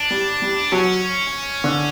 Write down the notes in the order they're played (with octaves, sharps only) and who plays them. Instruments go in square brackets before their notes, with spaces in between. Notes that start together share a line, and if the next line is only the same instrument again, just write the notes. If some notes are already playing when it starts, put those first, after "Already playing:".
Already playing: [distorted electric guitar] D4
[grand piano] G3
G3
[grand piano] F#3 [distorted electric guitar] C#4
[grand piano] D3